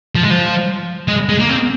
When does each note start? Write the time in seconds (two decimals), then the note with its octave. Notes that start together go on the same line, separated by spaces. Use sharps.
0.15 F3
0.23 G#3
0.30 F3
1.08 G#3
1.29 G#3
1.40 A#3
1.49 C4